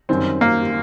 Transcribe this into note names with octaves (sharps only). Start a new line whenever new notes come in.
F#2 D#3 G3 C4
A#3